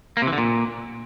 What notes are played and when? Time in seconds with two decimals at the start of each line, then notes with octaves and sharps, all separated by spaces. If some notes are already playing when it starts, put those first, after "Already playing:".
0.17 A#3
0.22 C3
0.27 E3
0.33 D3
0.38 A#2